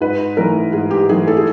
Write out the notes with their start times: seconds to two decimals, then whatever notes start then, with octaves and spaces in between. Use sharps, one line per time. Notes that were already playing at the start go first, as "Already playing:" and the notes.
0.01 G#2 B4
0.37 E3 A3 A#4
0.73 G#2 G#4
0.91 G4
1.09 E3 A3 G#4
1.27 A4
1.37 G#4